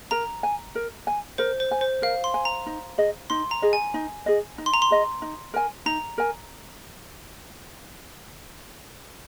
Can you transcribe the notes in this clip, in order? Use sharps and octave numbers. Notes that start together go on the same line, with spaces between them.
A#4 A#5
G#5
A#4
G#5
A#4 C5
C5
G#5
C5
A#4 F5
C6
G#5
A#5
D#4
G#4 D#5
D#4 C6
A#5
G#4 D#5
G#5
D#4
G#4 D#5
D#4
C6
A#5
C6
G#4 D#5
D#4
A#4 G#5
D#4 A#5
A#4 G#5